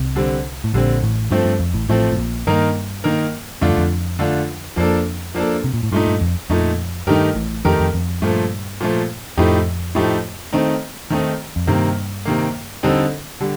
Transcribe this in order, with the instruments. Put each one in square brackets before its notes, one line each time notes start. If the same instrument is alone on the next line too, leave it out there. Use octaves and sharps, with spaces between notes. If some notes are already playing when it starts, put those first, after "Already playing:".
Already playing: [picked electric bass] C2 C3
[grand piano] D3 G3 C4
[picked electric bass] A2
[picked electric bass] A#1 A#2 [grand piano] D3 G3 C4
[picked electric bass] A1 A2
[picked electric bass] G2 [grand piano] F3 A3 C4
[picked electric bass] G2
F2
A1 A2
[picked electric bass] A1 A2 [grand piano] F3 A3 C4
[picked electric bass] A2
A#1 A#2
[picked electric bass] G2 [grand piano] D#3 A#3 D#4 A#4
[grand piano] D#3 A#3 D#4 A#4
[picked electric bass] F2 [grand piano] D3 A3 D4 F4
[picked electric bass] G2
F2
[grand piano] D3 A3 D4 F4
[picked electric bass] F2 [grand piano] F3 A#3 D4 A4
[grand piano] F3 A#3 D4 A4
[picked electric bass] C3
A#2
A2
[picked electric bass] G2 [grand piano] A#2 A3 D#4
[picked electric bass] G2
F2
[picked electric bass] F2 [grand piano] A#2 A3 D#4
[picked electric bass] G2 [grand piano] D#3 A3 D#4 G4 A#4
[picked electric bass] A1 A2
[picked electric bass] F2 [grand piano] D#3 A3 D#4 G4 A#4
[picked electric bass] F2
F2
[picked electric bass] G2 [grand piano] A#2 F3 A3
[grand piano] A#2 F3 A3
[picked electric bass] F2 [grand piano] A2 F3 A3 D#4 G4
[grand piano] A2 F3 A3 D#4 G4
D#3 A3 C4 D#4
D#3 A3 C4 D#4
[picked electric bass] F2
[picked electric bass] G2 [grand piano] C3 D#3 A#3
[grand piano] C3 D#3 A#3
D3 G3 C4 D#4 A4
D3 G3